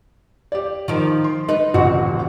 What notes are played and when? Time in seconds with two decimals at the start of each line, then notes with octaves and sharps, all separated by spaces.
0.52 G4 D5
0.88 D#3 F3
1.24 C6
1.49 D#4 B4
1.74 D#1 A1 C#3 C4 F#4